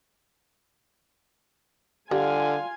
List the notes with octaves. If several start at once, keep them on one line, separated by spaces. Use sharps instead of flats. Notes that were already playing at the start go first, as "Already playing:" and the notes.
D3 G3 F4 F5 G#5